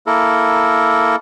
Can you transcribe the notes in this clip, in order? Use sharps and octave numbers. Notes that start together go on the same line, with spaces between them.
A#3 E4 A4 A#4